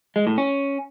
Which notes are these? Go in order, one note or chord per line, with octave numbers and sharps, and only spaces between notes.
G#3
A2
C#4